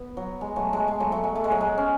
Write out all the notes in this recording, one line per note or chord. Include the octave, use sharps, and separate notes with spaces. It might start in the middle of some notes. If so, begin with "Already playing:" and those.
Already playing: B3
F#3
G#3
F#3 A3
G#3
G#3
F#3 A3
F#3 A3
G#3
A3
G#3
F#3
G#3
C#4